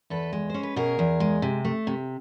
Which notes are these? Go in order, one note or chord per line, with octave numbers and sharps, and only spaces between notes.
E2 A4 B4
G#3
C#4 C5
B4
B2 G#4 A#4
E2
G#3
C3
A3
C3